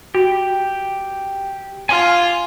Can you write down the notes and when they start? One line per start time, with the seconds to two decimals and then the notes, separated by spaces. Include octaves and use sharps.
0.15 F#4 G4
1.89 F4 G#5 D6 F6